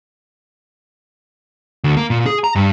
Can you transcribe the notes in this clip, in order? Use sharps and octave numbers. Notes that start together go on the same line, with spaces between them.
D2
A#3
A#2
G#4
A#5
G2